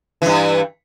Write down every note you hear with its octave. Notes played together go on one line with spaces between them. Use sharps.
G2 E3